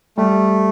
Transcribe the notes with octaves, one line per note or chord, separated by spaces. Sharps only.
G3 A3